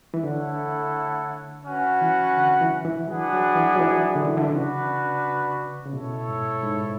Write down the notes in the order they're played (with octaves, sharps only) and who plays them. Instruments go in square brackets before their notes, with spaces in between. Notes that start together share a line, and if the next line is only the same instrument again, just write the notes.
[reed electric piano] E3
[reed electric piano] D3 [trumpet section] A3 E4 A4 C#5 F#5
[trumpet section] C#4 F#4 B4 F#5
[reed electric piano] E3
D3
E3
E3
[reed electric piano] F#3 [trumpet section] D4 G#4 B4 F#5
[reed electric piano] F#3
E3
F#3
E3
D3
E3
D3
[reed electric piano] C#3 [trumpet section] D4 F#4 B4
[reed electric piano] C#3
[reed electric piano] B2 [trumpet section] E4 A4 C#5
[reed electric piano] G#2
G#2